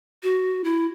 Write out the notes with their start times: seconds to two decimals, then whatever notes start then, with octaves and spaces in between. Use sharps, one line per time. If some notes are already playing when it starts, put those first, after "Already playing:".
0.23 F#4
0.64 E4